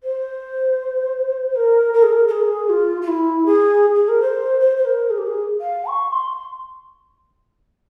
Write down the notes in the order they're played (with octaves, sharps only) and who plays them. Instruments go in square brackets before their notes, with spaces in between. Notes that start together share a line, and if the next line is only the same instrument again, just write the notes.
[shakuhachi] C5
A#4
A#4
G#4
A#4
A#4
G#4
F4
F4
E4
G#4
G#4
A#4
C5
C5
C5
A#4
G#4
G4
G#4
F5
C#6
C6